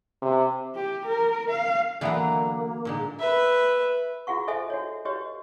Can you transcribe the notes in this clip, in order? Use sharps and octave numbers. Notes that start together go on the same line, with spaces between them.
C3
G4
A#4
F5
D3 E3 F#3 A#3 B3 A#5
A#2 D3 G#3 D#4
B4 E5
F4 F#4 G#4 F#5 C#6
A4 C5 D#5 E5 G#5
F#4 C#5
F#4 G4 B4 C#5 D#5